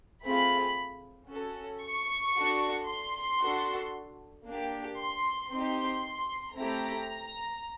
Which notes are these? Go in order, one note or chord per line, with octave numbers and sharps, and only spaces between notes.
A3 C4 F4 G#4 B5
C#4 F#4 A4
C#6
D4 F#4 A4
C6
D4 F#4 A4
A#3 D4 G4
C6
C4 D#4 G4 C6
A3 C4 E4 G4 A#5